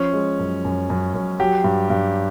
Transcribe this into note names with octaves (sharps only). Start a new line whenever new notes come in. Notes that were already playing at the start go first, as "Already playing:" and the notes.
Already playing: F3 C#4
G#3
F#2
F#2
F#2
F#2
F#3 G4
G2
G2